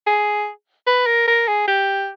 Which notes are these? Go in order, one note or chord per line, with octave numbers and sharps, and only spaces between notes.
G#4
B4
A#4
A#4
G#4
G4